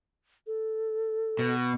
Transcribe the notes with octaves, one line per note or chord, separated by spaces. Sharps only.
A4
B2